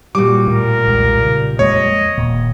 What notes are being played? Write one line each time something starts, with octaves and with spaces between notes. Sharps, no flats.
A#2 G3 F#4 D6
A2 A#4
B1 E2 G#3
C#3
F2 G#3 A#3 C#5 D#5
D#1 A#2